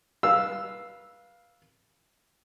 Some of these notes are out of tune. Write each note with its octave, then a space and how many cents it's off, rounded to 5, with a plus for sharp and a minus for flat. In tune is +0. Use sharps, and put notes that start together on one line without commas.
B4 -25 F5 +0 E6 +0